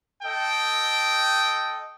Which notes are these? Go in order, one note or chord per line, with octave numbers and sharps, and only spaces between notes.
A4 D#5 G5